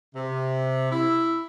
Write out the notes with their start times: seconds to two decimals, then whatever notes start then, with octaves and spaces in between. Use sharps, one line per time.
0.15 C3
0.92 E4